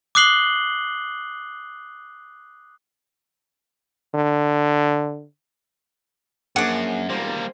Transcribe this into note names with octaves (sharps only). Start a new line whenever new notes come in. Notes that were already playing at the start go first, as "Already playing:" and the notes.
D6 D#6 F#6 C7 F#7 G7
D3
F#2 F3 A#3 D4 G#4 F#5 D6
E1 G3 A#3 C5